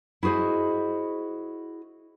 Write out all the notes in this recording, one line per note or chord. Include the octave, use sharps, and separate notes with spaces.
E4 F#4 G#4 C5 D#5